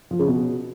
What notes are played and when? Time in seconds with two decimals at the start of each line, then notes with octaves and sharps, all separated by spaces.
0.11 F3
0.19 C#3
0.28 B2